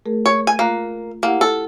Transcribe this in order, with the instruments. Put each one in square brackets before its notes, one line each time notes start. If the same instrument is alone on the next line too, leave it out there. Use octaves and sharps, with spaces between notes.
[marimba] A3 G#4 A#4
[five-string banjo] C#5
G#5
[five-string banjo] A#3 [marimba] F4 A#5 F#6
[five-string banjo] A#3 [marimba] E4 G4 F#5
[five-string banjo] A4 [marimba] F6